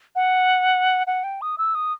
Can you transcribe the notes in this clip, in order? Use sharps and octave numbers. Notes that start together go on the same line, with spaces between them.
F#5
F#5
G5
D#6
E6
D#6